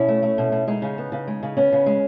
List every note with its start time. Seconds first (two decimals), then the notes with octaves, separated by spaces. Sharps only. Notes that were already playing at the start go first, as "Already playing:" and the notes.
Already playing: B2 C#4 E4
0.08 A3
0.23 A3
0.38 B2
0.52 B2
0.67 G#3 D#4
0.82 C#3
0.98 B3
1.12 C#3
1.27 G#3
1.43 C#3
1.57 B3 C#4
1.73 C#3
1.86 G#3